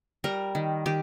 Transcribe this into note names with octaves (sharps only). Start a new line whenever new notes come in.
G3 A#4
D#3
D#3 G4